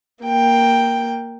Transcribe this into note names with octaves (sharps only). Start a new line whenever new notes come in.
A#3 G5